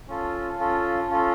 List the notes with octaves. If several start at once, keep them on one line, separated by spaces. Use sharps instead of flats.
C#4 F4 A4
C#4 F4 A4
C#4 F4 A4